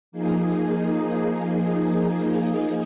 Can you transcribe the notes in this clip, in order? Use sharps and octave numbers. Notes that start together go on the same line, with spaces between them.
F3 A#3 D#4 G#4